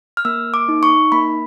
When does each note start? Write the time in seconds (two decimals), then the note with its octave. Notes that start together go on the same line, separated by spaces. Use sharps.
0.17 F6
0.25 A#3 E6
0.54 D6
0.69 D#4
0.83 C#6
1.12 A#3 B5